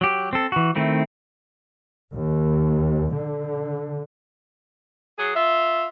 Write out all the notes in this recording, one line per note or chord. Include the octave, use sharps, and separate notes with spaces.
F#3 G4
C4 A4
E3 F#4
D#3 A3 C4 E4
D#2
D3
F#3 G#4
F4 E5